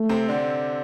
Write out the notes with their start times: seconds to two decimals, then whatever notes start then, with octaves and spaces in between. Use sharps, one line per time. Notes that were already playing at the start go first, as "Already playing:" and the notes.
Already playing: A3
0.09 C3 C4
0.29 D3 D4